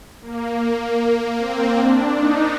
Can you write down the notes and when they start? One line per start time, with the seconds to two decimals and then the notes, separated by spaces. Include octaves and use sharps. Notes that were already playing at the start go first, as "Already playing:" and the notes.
0.22 A#3
0.60 A#3
1.38 C4
1.76 D4
2.14 D#4